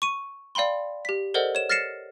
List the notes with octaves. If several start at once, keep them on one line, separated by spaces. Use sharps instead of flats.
C#6 D#7
D5 F5 G5 B5 C6
G4 B6
A4 A#4 C5 D5 D#5 F#5
C#5 E7
F6 A6 A#6 C7 C#7 E7